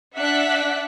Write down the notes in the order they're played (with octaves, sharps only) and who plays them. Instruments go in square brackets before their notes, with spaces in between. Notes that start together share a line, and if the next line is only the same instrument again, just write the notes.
[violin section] D4 D5 E5 F#5 F#6 B6